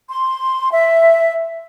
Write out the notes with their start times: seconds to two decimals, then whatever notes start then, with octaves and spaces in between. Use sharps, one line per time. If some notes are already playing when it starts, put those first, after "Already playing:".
0.09 C6
0.71 E5